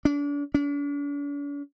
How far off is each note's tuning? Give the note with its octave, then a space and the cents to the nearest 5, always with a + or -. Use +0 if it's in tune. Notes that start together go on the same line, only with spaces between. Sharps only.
D4 -35
D4 -45